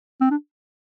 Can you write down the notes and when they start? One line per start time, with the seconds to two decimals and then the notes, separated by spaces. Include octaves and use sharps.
0.21 C4
0.31 D4